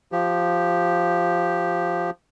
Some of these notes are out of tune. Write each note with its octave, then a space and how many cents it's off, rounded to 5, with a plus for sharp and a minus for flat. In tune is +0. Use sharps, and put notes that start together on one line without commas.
F3 +0 G4 -5